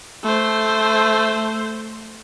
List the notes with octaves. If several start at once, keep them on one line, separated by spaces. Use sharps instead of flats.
A3 C5